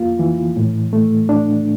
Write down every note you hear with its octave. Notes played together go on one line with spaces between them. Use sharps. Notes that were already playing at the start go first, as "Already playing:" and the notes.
Already playing: F2 A#3 F4
E3
A2
A3
D4